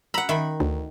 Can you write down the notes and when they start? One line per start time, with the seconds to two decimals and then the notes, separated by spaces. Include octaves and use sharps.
0.14 F#5 A#5 B5 E6
0.29 D#3 E5 B5
0.60 D2